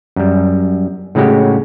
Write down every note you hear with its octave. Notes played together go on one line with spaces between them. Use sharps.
F#2 G3
A2 C#3 G#3 F#4 G4